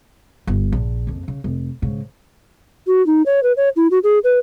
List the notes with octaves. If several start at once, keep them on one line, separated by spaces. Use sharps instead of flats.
G1
A#1
F#1 F2
C#3
F1
G#2 C#3
F#4
D#4
C#5
B4
C#5
E4
F#4
G#4
B4